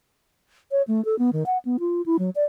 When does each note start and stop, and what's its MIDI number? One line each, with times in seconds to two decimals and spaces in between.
0.71 0.82 73
0.88 1.04 57
1.05 1.18 69
1.19 1.30 59
1.33 1.44 51
1.46 1.58 78
1.65 1.77 59
1.80 2.02 65
2.06 2.17 64
2.19 2.30 54
2.35 2.44 74